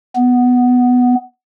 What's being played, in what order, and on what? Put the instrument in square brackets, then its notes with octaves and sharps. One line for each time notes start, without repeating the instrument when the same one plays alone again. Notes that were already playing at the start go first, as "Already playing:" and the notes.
[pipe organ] B3